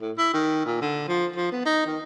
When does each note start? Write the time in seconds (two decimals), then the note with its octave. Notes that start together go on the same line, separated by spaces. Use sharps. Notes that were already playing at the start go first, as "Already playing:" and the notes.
0.01 A2
0.18 E4
0.34 D#3
0.66 A#2
0.81 D3
1.08 F3
1.36 F3
1.52 B3
1.66 D#4
1.86 D#3